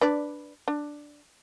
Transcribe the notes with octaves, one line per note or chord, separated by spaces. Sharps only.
D4 B4 D5
D4